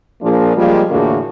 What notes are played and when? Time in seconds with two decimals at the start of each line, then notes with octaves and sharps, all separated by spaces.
0.23 A#2 F3 A#3 D4 F4 G#4
0.56 F3 G3 G#3 A#3 F4
0.91 E2 A2 D3 A#3 F#4 G#4